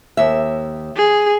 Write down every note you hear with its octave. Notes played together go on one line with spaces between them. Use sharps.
D#2 E5
G#4